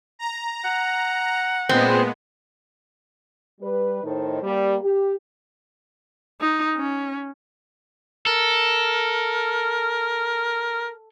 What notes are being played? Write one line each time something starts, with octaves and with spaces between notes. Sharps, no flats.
A#5
F#5
A#2 G#3 B3 C4
G3 B4
A2 D#3 D#4 A4 C5
G3 A#3
G4
D#4
C#4
A4 A#4